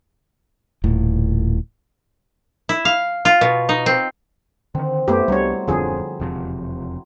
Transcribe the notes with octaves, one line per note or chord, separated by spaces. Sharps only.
D#1 A2
E4
F5
F4
B2
D#4
C4
D3 D#3 C4
F#2 A3 B3 E4 G4 C5
C2 F#3 G3 B3 D4 C#5
D1 F2 D3 F3 C4 G#4
E1 F2 C3